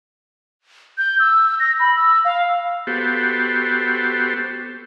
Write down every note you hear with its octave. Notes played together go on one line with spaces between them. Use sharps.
G6
E6
A#6
B5
E6
F5
B3 F#4 G4 A4 C5